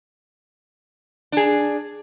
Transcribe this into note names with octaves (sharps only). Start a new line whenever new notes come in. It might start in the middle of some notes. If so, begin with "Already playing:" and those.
D4 G#4